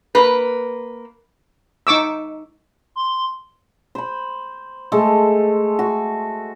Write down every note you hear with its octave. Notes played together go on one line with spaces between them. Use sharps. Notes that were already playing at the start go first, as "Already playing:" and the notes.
A#3 B4
D#4 C#6 D6 E6
C6
C5 B5
G#3 A3 A4
F#4